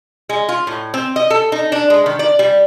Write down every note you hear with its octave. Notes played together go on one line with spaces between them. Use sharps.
G#3
F4
A2
C4
D#5
A4
D#4
D4
G#3
D#3
D5
G3